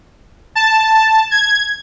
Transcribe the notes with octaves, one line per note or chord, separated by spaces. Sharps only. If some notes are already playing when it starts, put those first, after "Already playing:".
A5
G#6